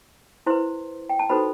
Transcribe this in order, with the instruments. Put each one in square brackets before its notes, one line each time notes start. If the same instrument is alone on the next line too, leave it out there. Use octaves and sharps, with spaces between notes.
[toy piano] E4 B4 C5 C6
G5
A5
D#4 F#4 A4 B4 C5 B5